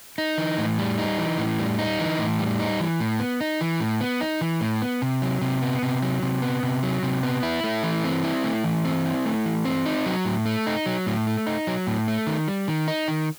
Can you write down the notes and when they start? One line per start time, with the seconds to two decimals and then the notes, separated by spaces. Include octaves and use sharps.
0.18 D#4
0.38 E3
0.58 A2
0.79 G3
0.98 D#4
1.18 E3
1.38 A2
1.59 G3
1.79 D#4
1.99 E3
2.19 A2
2.39 G3
2.60 D#4
2.80 E3
3.00 A2
3.19 B3
3.41 D#4
3.61 E3
3.80 A2
4.01 B3
4.21 D#4
4.41 E3
4.61 A2
4.82 B3
5.02 C3
5.22 F#3
5.42 C3
5.62 B3
5.83 C3
6.03 F#3
6.23 C3
6.42 B3
6.63 C3
6.83 F#3
7.03 C3
7.23 B3
7.43 E4
7.64 A3
7.83 E3
8.04 C4
8.24 E4
8.44 A3
8.64 E3
8.85 C4
9.05 E4
9.25 A3
9.46 E3
9.65 C4
9.86 D#4
10.06 F#3
10.25 A2
10.46 A3
10.67 D#4
10.86 F#3
11.06 A2
11.27 A3
11.47 D#4
11.67 F#3
11.87 A2
12.08 A3
12.27 D#3
12.48 G3
12.68 D#3
12.88 D#4
13.08 D#3